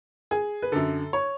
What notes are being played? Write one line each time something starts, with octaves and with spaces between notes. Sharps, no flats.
G#4
B4
F#2 D3 A4
C#5